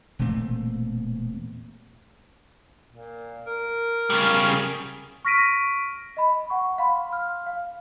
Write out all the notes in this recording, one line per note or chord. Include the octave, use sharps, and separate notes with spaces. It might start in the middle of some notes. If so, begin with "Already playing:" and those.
E1 A#2 A3 C4
A#2
A#4
C#3 G3
G#4
C#6 F6 A#6 B6 D7 D#7
D#5 B5
F#5 C#6
F5 B5 C6
F6
F5